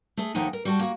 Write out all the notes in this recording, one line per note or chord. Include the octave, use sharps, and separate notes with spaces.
A3 G#4
D#2 D#3 F3 D#4 F#5 G#5
A#4
G3 F#4 A5
A#3 F#4